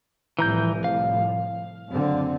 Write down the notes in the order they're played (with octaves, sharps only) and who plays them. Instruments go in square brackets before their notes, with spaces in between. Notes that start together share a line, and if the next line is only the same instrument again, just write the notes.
[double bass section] C2 A2 F3 [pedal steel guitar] E3 A#5 G6
[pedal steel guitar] F5
[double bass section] F#1 D3 C4